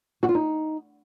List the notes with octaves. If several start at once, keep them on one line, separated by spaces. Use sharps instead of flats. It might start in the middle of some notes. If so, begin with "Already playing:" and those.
F#4
F4
D#4